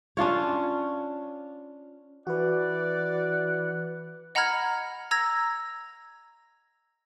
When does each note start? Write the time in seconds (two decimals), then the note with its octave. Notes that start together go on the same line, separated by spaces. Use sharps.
0.17 C#4 D4 F4 C#5
2.27 E3 F#4 B4 D5 F#5
4.35 D#5 F#5 A#5 B5 F6 G#6
5.11 A#5 E6 G#6 A#6